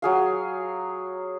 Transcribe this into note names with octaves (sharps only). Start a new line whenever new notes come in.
F#3 G#4 F5